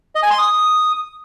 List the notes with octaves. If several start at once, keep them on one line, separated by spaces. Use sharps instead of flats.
D#5
G#5
C6
D#6